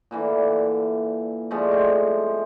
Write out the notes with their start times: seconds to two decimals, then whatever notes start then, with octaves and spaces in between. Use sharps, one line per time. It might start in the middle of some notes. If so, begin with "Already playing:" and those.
0.11 A#2 D3 E3
1.51 D3 F3 G#3 A3
1.72 C4